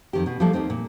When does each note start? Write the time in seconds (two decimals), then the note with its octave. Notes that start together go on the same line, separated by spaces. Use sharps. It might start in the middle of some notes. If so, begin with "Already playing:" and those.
0.13 F2 D#3 G4
0.26 B2
0.40 F3 G3 A3 A#3 E4 A4
0.53 D#2 D#3 C4 D#4
0.70 A#2